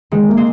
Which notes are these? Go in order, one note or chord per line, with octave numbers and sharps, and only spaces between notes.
D#3 G#3
A#3
G#3 C4